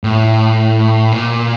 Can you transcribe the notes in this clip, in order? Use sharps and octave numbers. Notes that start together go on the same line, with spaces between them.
A2
A#2